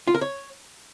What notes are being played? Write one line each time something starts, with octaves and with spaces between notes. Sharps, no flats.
F4
A#4
C#5